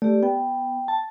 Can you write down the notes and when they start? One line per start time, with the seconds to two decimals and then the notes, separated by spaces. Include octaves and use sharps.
0.02 A3 G4 D5
0.23 B3 G5
0.88 A5